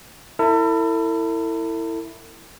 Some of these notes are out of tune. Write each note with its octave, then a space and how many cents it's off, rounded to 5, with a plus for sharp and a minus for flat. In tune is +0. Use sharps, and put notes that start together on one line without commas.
E4 +0 A4 +40